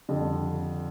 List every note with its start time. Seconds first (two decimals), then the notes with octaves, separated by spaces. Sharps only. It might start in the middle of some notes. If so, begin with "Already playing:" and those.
0.09 F2 D3 G3